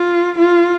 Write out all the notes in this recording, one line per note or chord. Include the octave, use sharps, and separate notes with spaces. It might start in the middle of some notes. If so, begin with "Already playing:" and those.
Already playing: F4
F4